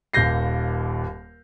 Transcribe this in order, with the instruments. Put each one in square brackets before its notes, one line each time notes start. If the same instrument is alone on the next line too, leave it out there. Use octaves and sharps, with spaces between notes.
[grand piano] D#1 D#2 G6 A#6 C7